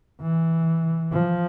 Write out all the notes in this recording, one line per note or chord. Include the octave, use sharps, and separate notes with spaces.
E3
F3